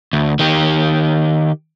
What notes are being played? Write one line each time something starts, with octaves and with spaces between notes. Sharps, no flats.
D2
D#3 G4